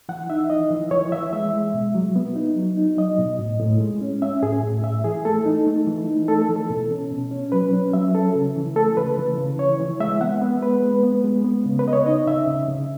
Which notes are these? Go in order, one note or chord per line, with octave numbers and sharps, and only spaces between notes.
E3 F#5
D#4 E5
E3 D#5
E3
E3 C#5
E3 E5
G#3 E5
G#3
B2
F#3
B3
D#4
F#3
D#4
F#3 D#5
B2
A2
A2
G#3
C#4
C#4 E5
A2 G#4
A2
A2 E5
E3 G#4
A3 A4
D#4
A3
E3
D#4
A3 A4
A4
E3
A4
B2
C#4
B2
C#4
F#3 B4
C#4
F#3 E5
C#4 A4
C#3
E3
A3 A4
C#3 B4
E3
C#3
E3 C#5
E3
G#3 E5
B3 F#5
B3
G#3 B4
G#3
B3
G#3
B3
C#3
B4
C#3 D#5
C#5
D#4 D#5
C#3 E5
C#3
C#3